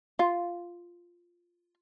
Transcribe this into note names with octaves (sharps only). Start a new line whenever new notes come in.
F4